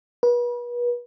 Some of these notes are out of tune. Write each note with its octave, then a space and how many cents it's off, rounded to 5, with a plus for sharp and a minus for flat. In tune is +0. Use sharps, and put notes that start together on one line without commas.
B4 -35